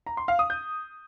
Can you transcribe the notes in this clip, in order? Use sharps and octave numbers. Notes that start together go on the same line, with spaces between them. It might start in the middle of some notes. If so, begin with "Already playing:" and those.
A#5
C6
F5
D#6
G6